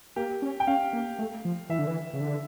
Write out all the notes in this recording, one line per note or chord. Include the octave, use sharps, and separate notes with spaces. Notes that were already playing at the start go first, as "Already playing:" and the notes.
A#3 G4
C#4
G5
C#4 F5
A#3
A3
F3
E3 E5
D3
E3
C#3
D3